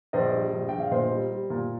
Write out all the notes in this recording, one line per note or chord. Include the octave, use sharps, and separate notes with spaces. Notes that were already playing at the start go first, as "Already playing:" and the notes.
A#1 C5 D#5
G3
A#1
A#1 G5
F5
A#2 C5 D#5
G3
G3
A#2